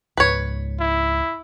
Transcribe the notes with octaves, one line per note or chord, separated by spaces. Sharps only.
C#2 G#2 B4 C#5
E4